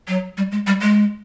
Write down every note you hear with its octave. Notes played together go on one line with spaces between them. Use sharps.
F#3
G3
G#3
G3
G#3